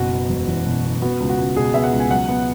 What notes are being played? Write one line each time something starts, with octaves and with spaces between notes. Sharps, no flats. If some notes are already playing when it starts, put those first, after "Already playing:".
Already playing: F#1 B2 F#4
B3
E1
E2
B2
B3
B3 F#4
C#2
F#4
C#2
B2 G#4
B3 E5
F#5
C#2
G#5
F#3 F#5
B3